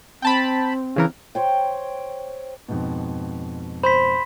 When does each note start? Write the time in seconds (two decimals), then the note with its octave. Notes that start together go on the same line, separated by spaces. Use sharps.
0.22 C4 G5 A5 B5
0.96 C#3 E3 A#4
1.35 C5 C#5 G5
2.68 F2 G#2 B2
3.83 C5 B5 C6 B6